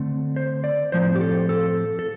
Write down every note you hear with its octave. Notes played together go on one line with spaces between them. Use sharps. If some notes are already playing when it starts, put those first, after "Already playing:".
Already playing: D3 A3 C4
C5
D5
A2 F3 C4 C5
G4
A4
A4
A4